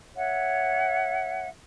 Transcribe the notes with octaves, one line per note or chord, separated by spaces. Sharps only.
C#5 E5 F#5